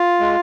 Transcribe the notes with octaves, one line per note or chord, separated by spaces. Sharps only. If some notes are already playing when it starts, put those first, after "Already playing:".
Already playing: F4
G#3